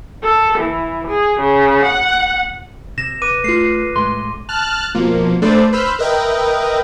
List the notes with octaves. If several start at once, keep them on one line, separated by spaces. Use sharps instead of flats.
A4
E3
G#4
C#3
F#5
C3 A#6 E7
B4 D6 D#7
A3 F4 C7
A2 G#3 A3 C6
A5 F6 F#6
B2 F3 A#3
A3 D4 A4 B4 C5 D5
B4 C5 B5 E6 F6 G6
A#4 B4 D#5 E5 G5